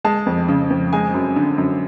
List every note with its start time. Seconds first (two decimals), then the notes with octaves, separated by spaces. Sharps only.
0.04 G#3 A5
0.26 F2
0.49 C#3
0.70 F2
0.93 G#3 G#5
1.14 F#2
1.36 D3
1.58 F#2